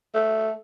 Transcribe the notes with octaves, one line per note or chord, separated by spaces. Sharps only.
A3